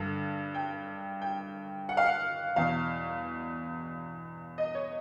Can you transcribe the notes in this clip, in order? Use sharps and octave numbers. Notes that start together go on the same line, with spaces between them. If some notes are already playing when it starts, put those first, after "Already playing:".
Already playing: G2 D3
G5
G5
F#5
F5
F#5
E2 B2 F5
D#5
C#5